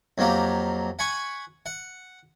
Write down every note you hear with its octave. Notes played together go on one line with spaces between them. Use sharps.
F2 F#3 A#3 G4 F5
F#5 G#5 B5 C#6
F#5